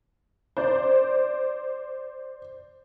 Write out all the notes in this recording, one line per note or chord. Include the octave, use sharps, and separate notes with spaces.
C5 D5